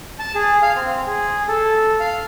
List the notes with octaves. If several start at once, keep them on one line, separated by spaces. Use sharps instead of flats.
A5
G#4
F5
C4
G#4
A4
F5